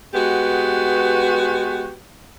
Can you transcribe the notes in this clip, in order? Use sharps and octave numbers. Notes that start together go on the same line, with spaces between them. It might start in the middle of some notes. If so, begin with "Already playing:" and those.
G#3 B3 F#4 G4 B4